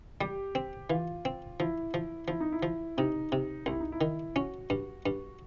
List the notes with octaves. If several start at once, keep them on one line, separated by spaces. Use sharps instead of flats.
G3 G4
C4
E3 F4
C4
F3 E4
F3
F3 E4
D#4
E4
F3
C3 D#4
C3
C2 E4
D#4
E4
D#3
C#4 F#4
G2
G2